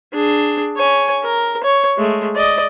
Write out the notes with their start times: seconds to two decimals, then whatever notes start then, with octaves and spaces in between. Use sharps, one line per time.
0.13 D4 G#4
0.76 C#5 G#5
1.23 A#4
1.64 C#5
1.97 G#3 A3
2.35 D5 D#5